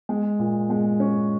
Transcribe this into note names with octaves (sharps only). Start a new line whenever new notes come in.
G#3
A#2
G#3
C#4